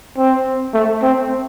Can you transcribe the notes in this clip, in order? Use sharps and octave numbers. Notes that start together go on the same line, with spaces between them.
C4
A3
C4